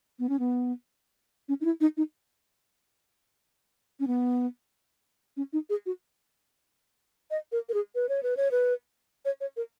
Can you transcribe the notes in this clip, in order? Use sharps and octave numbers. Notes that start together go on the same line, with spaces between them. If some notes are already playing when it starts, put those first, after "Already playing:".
B3
C#4
B3
C#4
D#4
E4
D#4
D#4
C#4
B3
C#4
D#4
G#4
F#4
D#5
A#4
A#4
G#4
B4
C#5
B4
C#5
B4
C#5
C#5
A#4